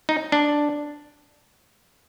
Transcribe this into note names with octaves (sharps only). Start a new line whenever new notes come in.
D#4
D4